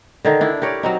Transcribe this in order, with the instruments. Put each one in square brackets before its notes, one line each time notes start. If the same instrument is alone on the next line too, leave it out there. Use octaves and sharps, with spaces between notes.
[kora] D3 D#3 D#4
D4 E4
G4 A#4 C#5 D5
F#3 C4 D#4